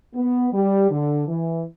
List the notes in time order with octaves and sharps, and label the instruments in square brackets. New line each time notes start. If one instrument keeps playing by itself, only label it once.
[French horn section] B3
G3
D3
E3